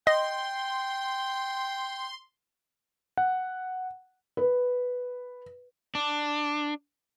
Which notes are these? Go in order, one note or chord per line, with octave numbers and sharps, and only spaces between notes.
D#5 G5 C6
F#5
B4
D4